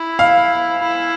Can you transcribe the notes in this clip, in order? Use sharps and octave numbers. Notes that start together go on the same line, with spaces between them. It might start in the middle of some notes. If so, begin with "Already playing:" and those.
Already playing: E4
F5
E4